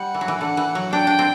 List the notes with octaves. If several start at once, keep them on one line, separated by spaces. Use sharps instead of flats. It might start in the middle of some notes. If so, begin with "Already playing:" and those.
Already playing: G3 F#5
E3
F#3
E3
D3 F#5
E3
F#3
D4 G5
D4
C4